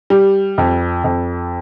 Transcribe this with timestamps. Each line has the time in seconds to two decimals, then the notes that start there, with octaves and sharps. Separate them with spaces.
0.10 G3
0.58 F2
1.04 F2